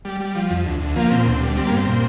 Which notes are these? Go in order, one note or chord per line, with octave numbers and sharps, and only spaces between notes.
G3
G3
F3
F2
D2
D2
F3 A#3
A#2 C4
D2 C4
G3
G3 C4
A#3
G2
C4
A#2